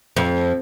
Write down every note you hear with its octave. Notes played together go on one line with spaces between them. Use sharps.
F2